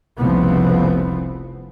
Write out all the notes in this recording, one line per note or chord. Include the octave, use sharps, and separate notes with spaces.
F1 C2 C#3 F3 B3 C4